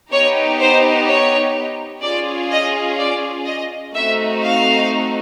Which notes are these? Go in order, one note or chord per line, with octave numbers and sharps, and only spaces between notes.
B3 D#4 G4 C#5
C5
C#5
C#4 F4 G#4 D5
D#5
D5
D#5
A3 C4 D#4 F#4 E5
F5